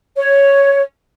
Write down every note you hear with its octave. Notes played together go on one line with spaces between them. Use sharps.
C#5